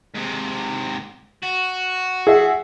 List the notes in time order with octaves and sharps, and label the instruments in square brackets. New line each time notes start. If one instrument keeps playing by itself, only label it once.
[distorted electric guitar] G#2 C3
F#4
[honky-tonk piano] G#4 E5 F#5